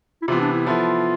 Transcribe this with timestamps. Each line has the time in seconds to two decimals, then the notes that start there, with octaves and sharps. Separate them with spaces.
0.22 E4
0.27 C3 E3 B3 F4
0.40 D4
0.53 E4
0.66 F3 B3 E4 F4 A4